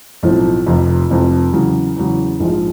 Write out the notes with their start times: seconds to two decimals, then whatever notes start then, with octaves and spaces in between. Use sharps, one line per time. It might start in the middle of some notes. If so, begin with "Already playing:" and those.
0.23 B1 A2 F3 A3 C4
0.66 F1 F2 C3 F3
1.10 F1 F2 C3 F3
1.53 E2 C#3 F#3
1.97 E2 C#3 F#3
2.40 A#1 G#2 F3 G#3